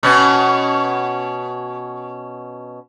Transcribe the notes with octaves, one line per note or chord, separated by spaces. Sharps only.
B2 C#4